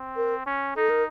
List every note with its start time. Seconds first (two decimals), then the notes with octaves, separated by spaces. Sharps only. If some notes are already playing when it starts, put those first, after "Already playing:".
Already playing: C4
0.16 A#4
0.46 C#4
0.76 D#4 A4
0.89 A#4